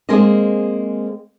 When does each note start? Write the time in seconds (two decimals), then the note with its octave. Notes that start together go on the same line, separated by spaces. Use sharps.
0.09 G#3 A#3 C4 G#4 C5 D#5